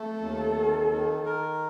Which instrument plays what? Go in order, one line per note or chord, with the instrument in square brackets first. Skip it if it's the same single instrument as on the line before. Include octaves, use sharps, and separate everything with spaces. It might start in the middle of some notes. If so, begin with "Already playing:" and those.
Already playing: [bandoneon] A3 [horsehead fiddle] A4
[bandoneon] D#2
D#3
D#3
A#4